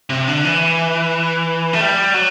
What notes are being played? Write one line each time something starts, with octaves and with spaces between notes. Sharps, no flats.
C3
D3
E3
A3
G3
F#3